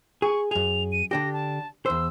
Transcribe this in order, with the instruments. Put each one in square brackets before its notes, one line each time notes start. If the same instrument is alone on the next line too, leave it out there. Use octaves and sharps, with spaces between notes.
[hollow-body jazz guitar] G#4 [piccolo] C#6
[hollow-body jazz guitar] F#2 G#4 [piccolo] F7
[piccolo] D#7
[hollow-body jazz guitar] D3 D4 G4 [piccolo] A#6
[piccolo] A5
[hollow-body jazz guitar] E2 C5 [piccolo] E6